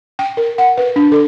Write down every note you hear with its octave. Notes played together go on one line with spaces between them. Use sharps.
G5
A#4
F#5
B4
D4
A4